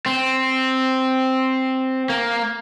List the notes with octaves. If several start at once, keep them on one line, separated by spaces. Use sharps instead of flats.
C4
A#3